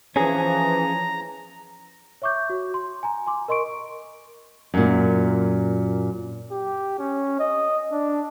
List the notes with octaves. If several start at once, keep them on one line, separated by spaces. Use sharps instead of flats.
E3 F3 C#4 G#4 A#5
C#5 E5 C#6 D6 G6
F#4
C6
G#5 A#5
G#5 C6 D6
A#4 D#5 C6 C#6 D7
F#2 A#2
G4
C#4
D#5
D4